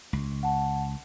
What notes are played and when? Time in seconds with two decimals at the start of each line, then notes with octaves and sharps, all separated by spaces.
0.13 C#2
0.43 F#5 A5